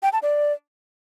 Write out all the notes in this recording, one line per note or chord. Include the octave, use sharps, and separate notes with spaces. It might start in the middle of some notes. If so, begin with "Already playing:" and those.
G5
A5
D5